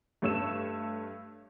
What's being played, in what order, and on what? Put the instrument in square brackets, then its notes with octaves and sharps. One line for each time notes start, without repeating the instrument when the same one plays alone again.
[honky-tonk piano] G2 A3 C#5 E6 E7